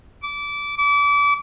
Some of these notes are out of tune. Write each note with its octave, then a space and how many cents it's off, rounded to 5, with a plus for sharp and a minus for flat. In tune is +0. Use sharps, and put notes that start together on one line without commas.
D6 -20
D6 -30